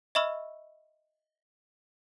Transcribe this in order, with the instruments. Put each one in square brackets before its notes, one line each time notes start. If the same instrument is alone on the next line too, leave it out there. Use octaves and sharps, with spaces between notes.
[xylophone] D#5 E5 B5 C#6 E6 F6